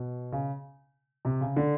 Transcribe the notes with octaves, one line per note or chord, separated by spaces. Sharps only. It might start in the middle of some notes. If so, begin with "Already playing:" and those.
Already playing: B2
C#3
C3
C#3
D3